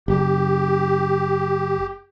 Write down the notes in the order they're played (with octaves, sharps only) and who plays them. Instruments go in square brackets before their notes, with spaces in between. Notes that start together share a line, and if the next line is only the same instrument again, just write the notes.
[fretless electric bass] F#1 [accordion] G4